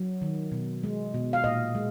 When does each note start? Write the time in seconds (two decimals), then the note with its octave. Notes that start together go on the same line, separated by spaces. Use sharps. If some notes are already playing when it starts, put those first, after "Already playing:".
Already playing: F#3
0.22 D#3
0.52 B2
0.84 G#3
1.14 B2
1.33 F5
1.44 A#2 D#5
1.75 G#3